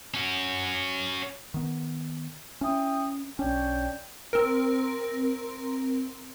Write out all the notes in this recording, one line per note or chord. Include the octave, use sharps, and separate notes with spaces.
C#4 F#4
D#3 B3
C#4 E4 G5 D#6
B1 C#4 D4 C#5 G5
C4 A#4